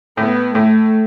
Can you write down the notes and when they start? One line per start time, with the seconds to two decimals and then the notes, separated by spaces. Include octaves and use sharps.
0.17 A2 B3
0.55 A2 A3